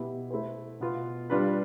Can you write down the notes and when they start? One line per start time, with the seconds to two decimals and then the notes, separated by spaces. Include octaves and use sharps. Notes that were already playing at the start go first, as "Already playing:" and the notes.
Already playing: B2 B3 E4 G4
0.30 A3 E4 A4 C5
0.80 B2 B3 F4
1.30 G3 D4 F4 B4